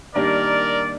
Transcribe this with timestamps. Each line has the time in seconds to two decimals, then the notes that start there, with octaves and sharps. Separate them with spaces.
0.15 D#3 G3 A#3 D4 A#4 D5